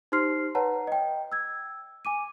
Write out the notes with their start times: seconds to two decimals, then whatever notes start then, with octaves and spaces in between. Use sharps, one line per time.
0.12 D#4 G4 C5 C6 F6 C7
0.55 B4 C#5 F#5 A5 A#5
0.87 D#5 G5
1.32 E6 G#6
2.05 G#5 D6 D#7